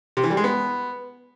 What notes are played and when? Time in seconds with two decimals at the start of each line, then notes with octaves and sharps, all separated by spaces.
0.17 C3
0.24 E3
0.30 G3
0.37 G#3
0.44 B3